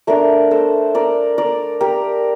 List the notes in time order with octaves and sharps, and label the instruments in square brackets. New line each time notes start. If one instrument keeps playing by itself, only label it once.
[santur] A3 D4 A#4 D5
A4 C5
A#4 D5
A#4 D5
G4 A#4